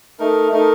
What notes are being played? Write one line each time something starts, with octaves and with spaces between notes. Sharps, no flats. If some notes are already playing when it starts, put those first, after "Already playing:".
A3 D#4 A#4
A3 D#4 A#4